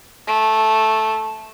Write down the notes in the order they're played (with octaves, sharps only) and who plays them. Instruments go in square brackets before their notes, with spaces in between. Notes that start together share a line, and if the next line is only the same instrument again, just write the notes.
[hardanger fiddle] A3